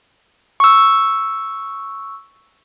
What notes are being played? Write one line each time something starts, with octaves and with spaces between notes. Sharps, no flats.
C#6 E6